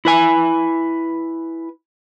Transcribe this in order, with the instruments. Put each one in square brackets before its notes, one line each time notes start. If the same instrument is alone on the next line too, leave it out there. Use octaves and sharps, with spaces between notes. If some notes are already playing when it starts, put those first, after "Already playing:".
[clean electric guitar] E4 B4 G#5